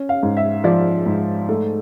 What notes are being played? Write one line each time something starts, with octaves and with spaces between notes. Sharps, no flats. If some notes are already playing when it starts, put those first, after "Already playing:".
Already playing: C#4
F5
G#2
E5
F3 D5
G#2
A3